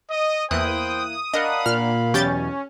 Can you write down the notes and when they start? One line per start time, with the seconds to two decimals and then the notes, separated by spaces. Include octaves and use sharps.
0.10 D#5
0.51 E2 A#3 E4 C5 G5 D#6 F#6
1.34 D4 A#4 D#5 F5 F#5 B5
1.66 A#2 F6
2.14 E2 B2 F#3 C#4 G4 G6 A6